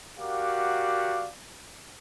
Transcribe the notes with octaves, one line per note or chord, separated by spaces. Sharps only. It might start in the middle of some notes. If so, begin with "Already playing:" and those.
F#4 G4 A#4 D5 F5 F#5